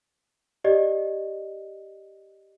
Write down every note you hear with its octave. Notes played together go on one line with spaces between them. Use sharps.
G4 D5 D#5